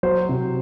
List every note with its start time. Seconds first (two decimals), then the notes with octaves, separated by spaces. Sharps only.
0.03 F#3 C5
0.29 C3